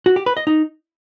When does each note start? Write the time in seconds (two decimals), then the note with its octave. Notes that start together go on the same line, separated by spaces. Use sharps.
0.06 F#4
0.16 G4
0.26 B4
0.37 D#5
0.47 D#4